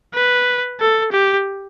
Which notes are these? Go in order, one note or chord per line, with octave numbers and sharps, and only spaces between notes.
B4
A4
G4